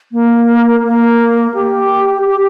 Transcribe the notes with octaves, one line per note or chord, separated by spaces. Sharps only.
A#3
A#3
G4
G4